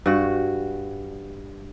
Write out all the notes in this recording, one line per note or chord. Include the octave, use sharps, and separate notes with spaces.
G2 F#4